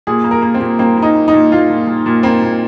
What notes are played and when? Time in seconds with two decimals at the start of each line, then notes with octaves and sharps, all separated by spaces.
0.07 A#2 G#4
0.24 A#3
0.31 A#4
0.42 A#3
0.54 C4
0.60 A#2
0.79 A#3 C4
0.98 A#3 D#4
1.15 A#3
1.28 D#4
1.33 A#2
1.52 A#2 F4
1.70 A#2
1.87 A#2
2.06 A#2
2.23 A#3 C4
2.42 A#2